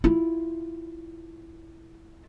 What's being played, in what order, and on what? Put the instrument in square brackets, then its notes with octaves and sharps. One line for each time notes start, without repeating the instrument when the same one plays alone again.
[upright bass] E4 F4